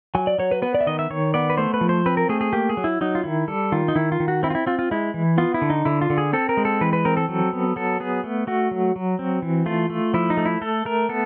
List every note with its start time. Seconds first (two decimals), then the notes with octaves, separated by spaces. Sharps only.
0.15 F#3 G#5
0.27 D5
0.39 F#3 C#5
0.51 B4
0.62 B3 B4
0.75 D5
0.81 E5
0.87 D#3 D#5
0.99 E5
1.10 D#3 C#5
1.34 B3 D5
1.50 B4
1.58 A3 C5
1.74 B4
1.81 F3
1.89 C5
2.06 C4 B4
2.17 A#4
2.29 A3 G#4
2.41 G#4
2.53 A#3 G4
2.69 G#4
2.77 F#3
2.84 E4
3.01 F#3 D#4
3.15 F4
3.24 D#3 E4
3.48 G3 A4
3.72 D#3 F4
3.88 D#4
3.95 D#3 E4
4.12 F4
4.20 D#3
4.28 F#4
4.43 C4 E4
4.50 F4
4.55 E4
4.67 C4 F4
4.79 F4
4.91 G#3 E4
5.14 E3
5.38 B3 F4
5.54 E4
5.62 D3
5.70 D#4
5.85 D3 E4
6.01 F4
6.10 D3
6.18 G#4
6.33 C4 A4
6.49 A#4
6.57 G#3
6.65 A4
6.81 E3 B4
6.93 B4
7.05 C4 A#4
7.17 A4
7.29 F#3
7.53 B3
7.76 F#3 A4
8.00 B3 G#4
8.24 A3
8.47 A3 F#4
8.71 F#3
8.96 F#3
9.19 C4
9.42 E3
9.66 A3 F4
9.90 A3
10.14 F3 E4
10.30 D#4
10.37 A3
10.46 E4
10.61 A3 A4
10.85 A3 A#4
11.09 B3 A4